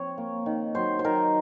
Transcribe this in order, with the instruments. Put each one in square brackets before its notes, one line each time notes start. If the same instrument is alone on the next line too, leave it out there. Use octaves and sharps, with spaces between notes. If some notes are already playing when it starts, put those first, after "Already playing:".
Already playing: [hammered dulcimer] F3 C4 C#5
A#3
D#3
F#3 C5
C5
D#3 A#4